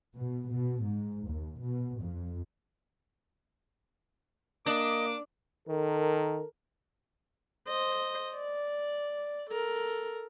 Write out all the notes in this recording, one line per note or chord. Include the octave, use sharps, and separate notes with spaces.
B2
B2
G#2
D#2
B2
F2
A#3 D4 D#5 D6
D#3 A4 A#4
C5 D#5
D5
A4 A#4